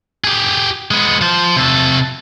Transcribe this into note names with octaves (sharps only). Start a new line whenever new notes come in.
G4 G#4
G#3 B3
F3 C5
C3 A4